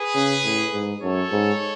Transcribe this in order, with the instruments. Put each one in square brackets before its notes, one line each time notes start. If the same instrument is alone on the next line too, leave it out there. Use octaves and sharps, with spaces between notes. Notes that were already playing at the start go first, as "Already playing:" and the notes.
Already playing: [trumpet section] G#4 B4
[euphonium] C#3
A2
G#2
[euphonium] F#2 [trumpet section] A4 C#5
[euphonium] G#2